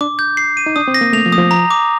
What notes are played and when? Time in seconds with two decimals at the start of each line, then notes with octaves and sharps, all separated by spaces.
0.01 D4 D6
0.19 G6
0.37 C7
0.57 D#7
0.66 D#4
0.76 D4 D#6
0.88 C4
0.94 A#6
1.01 A#3
1.13 A3 F7
1.26 F3
1.32 D#6
1.38 F3
1.51 A#5
1.70 D6